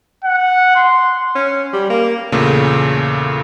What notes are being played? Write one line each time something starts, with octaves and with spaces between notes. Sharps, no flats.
F#5
C6
C#4
G3
A#3
E2 A#2 C#3 A3